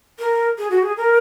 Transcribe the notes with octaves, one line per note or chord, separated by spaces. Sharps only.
A#4
G#4
F#4
G#4
A#4